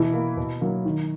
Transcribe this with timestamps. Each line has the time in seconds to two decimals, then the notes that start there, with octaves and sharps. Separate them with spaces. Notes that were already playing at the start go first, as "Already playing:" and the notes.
Already playing: B2 E3 E4
0.14 A#3
0.37 B2
0.61 F#3 A#3
0.85 D#3